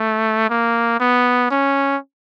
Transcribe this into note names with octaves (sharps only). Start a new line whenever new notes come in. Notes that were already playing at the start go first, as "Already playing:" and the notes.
Already playing: A3
A#3
B3
C#4